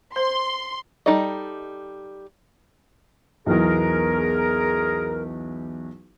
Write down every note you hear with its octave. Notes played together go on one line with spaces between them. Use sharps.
C5 C6
G3 D#4 A4 D5 D#5
B1 E2 G#4 A#4